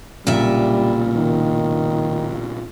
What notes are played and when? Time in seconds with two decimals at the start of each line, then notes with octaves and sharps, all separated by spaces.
0.27 B1 A#2 C#3 G3 E5
1.16 D#3